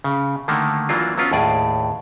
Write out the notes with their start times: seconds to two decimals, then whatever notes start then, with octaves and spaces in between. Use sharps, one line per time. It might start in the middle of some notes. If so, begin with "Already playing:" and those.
0.04 C#3
0.48 D3 D#3 A3 A#3
0.89 E3 F#3 A#3 D4 F4
1.18 F#3 B3 C#4 F4
1.32 D#2 A2 G#4 D5